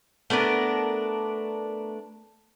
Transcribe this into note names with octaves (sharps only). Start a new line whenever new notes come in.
A3 B3 D4 A#4